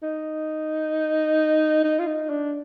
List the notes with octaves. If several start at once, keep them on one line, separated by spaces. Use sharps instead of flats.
D#4
D#4
F4
D#4
D4